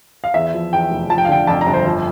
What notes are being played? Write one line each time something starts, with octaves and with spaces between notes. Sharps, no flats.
F5
E2 E5
F3
E2 G5
F1
F3 A5
G5
F5
D3 G5
F2 A5
A#5
G1
C5
F3